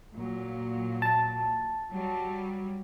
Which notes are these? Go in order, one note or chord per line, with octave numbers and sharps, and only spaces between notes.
A#2 F#3
A5
F#3 G3